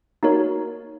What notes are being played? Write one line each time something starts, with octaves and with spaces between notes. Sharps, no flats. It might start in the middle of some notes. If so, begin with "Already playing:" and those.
A#3 D#4 F#4 A#4 C#5